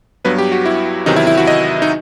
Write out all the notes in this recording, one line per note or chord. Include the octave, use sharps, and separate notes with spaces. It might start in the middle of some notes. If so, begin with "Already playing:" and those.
G2 F#3 B3 B4
G4
F#4
E4
E2 C3 D#3 F#3 D#4
E4
E4
F#4
D#5
D#4